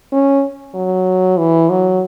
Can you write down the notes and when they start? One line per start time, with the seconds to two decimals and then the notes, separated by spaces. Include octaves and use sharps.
0.13 C#4
0.75 F#3
1.38 E3
1.70 F#3